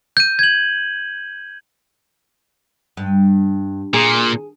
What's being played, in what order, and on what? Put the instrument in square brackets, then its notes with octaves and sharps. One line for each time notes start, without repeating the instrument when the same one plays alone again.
[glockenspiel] G6 D#7
G#6 F#7
[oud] G2
[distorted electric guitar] A#2 [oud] G#4